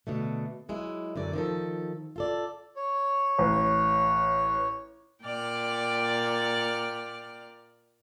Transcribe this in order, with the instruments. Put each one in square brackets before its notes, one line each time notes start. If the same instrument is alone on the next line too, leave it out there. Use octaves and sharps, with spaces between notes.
[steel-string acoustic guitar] B2 D3 A3
F#3 G#3 E4
F#2 D3 D5
D#3 F3 A4
F4 A4 D5
[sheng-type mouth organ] C#5
[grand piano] A1
[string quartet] A#2 D5 G5 F6